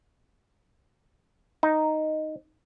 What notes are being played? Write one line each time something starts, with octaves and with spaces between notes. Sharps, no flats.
D#4